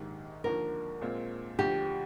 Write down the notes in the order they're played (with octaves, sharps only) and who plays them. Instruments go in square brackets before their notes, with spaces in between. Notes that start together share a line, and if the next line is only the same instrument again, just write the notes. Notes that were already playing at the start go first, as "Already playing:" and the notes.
Already playing: [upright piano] A#1 G#2 D#3 [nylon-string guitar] G4
[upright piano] D#2 D3 F3 [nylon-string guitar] A#4
[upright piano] A#2 G#3 C4 F4
[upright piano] D2 D3 F3 [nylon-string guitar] G4